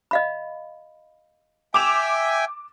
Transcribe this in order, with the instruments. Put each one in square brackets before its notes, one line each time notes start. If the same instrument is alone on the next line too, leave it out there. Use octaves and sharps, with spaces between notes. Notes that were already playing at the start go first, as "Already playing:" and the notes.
[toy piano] D#5 F5 B5
[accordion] E5 G5 G#5 [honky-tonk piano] D6 E7 F7